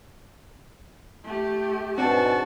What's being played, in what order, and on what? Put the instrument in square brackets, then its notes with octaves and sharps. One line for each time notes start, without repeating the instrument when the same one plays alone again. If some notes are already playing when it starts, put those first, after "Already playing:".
[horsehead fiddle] A3 G4
[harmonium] G#2 B2 [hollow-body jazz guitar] C4 D4 [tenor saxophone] F#4 [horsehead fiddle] A5